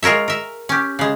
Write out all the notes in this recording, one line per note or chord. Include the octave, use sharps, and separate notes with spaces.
G#3 F4 A#4 C#5 E5
A#4 E5
C#4 G4
C#3 G#3